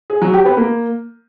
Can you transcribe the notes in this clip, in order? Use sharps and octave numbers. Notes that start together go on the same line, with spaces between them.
G#4
F#3
G4
B3
A#3